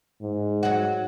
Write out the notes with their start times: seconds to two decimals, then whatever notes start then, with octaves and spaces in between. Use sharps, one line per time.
0.22 G#2
0.63 F#3 F#4